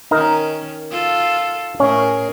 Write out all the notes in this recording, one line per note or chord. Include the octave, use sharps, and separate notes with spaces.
D#3 C#4 D#4 A#4
F4 A4
A2 C#4 G#4 A#4